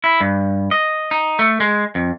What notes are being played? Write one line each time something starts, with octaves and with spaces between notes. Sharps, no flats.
E4
G2
D#5
D#4
A3
G#3
F2